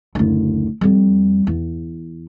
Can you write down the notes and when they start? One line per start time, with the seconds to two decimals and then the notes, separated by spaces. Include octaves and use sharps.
0.15 F#1 D2
0.81 F2 G3
1.47 E2